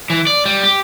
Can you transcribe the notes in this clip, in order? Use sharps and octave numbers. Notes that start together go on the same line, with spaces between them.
E3
D5
G3
G4